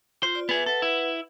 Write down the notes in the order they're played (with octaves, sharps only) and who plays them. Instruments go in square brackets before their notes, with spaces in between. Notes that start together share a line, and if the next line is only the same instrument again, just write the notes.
[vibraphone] F4 [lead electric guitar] C5
[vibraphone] F4 D5
[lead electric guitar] B3 G#4 [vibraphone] B4 E5
[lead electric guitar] A4 [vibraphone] B4 F#5
[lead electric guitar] E4